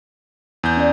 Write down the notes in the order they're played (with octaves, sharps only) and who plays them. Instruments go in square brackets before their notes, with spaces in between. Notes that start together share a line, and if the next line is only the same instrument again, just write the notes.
[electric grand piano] E2 G6
[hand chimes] C#4 D5